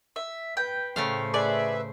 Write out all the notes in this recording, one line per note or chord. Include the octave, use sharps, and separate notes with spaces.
E5
B4 G5
A2 C#3 A3 C5 F5
G#4 B4 D5 E5